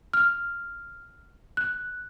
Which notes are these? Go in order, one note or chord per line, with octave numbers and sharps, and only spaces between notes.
F6
F#6